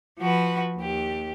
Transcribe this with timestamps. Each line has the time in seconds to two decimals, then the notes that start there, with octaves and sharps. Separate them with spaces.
0.19 F3 F#4 B4
0.77 D#2 G4